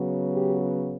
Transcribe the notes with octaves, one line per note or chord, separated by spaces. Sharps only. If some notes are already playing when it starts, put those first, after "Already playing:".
Already playing: C#3 F#3 B3
G4